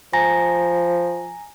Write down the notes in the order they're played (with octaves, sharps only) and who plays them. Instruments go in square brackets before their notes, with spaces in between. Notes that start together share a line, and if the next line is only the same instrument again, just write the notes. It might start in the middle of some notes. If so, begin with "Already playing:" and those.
[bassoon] F3 [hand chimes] G#5 A#5 A#6